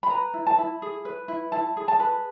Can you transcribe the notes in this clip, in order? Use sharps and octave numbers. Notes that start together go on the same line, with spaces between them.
B5
B4 A#5
E4
A5
E4
G#4
B4
E4
E4 A5
G#4
A5
B4